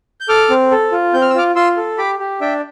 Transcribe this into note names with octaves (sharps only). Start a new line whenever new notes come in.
G6
A4 D6 F6
C4
A4
F4
C4 G6
F6
E6
F4 D6 F6
F4 C6 E6
A4
G4 B5 D6
G4
D4 E5 G5